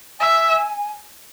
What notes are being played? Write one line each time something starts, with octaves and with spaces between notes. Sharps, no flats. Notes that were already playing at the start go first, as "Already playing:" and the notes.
E5 G#5